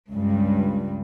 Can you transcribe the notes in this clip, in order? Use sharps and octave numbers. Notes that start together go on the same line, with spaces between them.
C#2 G2